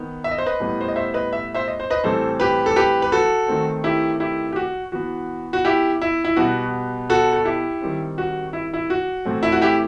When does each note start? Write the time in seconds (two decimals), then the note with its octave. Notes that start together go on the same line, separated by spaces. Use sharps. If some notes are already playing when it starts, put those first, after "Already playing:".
Already playing: D#3 B3
0.24 E5
0.31 D#5
0.38 C5
0.46 B4 D#5
0.60 A2 G3 B3
0.81 C5
0.88 D#5
0.96 C5 E5
1.14 B4 D#5
1.33 E5
1.54 C5 E5
1.68 D#5
1.80 C5
1.90 B4 D#5
2.04 A2 E3 G3 C4 A4 C5
2.40 G4 B4
2.66 A4
2.76 G4 B4
3.02 B4
3.12 F#4 A4
3.48 D#3 A3 C4
3.84 E4 G4
4.20 E4 G4
4.52 G4
4.56 F#4
4.92 E3 B3 F#4
5.53 F#4
5.65 E4 G4
6.02 E4
6.24 E4
6.36 B2 G3 B3 F#4
7.10 F#4 A4
7.33 A4
7.45 E4 G4
7.82 D#3 G3 C4
8.18 F#4
8.53 E4
8.74 E4
8.90 F#4
9.25 A2 E3 A3 C4
9.43 E4
9.52 F#4
9.61 E4 G4